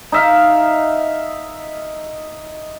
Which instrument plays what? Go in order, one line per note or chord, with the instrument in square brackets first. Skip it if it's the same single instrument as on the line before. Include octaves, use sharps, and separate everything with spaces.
[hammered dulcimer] D#4 E5 F5